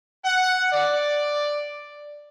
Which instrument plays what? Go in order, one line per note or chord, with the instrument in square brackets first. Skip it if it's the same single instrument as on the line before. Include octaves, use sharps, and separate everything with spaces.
[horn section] F#5
D5